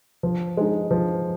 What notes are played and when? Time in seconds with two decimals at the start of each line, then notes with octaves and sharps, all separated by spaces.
0.23 F3
0.57 G#3 D#4
0.91 F3